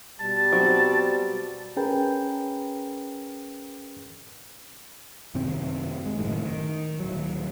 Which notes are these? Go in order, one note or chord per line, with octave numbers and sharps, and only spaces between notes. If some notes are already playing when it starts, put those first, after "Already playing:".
B2 G3 A5
F#3 C4 F#4
C#4 G#4 A#4 B4 G5
F#2 C3 D#3 C4
G#3
F#1 F#2 A2 D#3
D#3
D#1 F#3